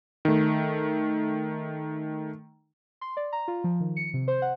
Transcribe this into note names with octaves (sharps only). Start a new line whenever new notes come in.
D#3 A3
C6
D5
A#5
F4
F3
D#3
C#7
C3
C5
F#5